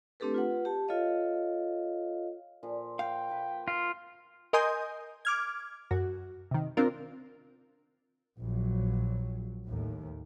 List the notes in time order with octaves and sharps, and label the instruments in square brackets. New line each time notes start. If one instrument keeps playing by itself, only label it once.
[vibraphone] A3 C4 D4 G4 A4 B4
F4 B4 F#5
G4 A5
F4 A4 C#5 D#5 F5
[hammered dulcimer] A#2 F3
[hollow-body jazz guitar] F5 [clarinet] G5
[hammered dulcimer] A#3 B4
[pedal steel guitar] F4
[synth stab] A#4 D#5 G#5 C6 D#6 G6
D6 F6 G#6
F#2 F#4
C3 D#3
C4 D4 F4 A#4
[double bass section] A#1 F#3
D#2 A2